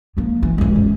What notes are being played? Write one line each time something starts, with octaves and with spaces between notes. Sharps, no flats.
F3 A#3
E3
E3 G#3
F#2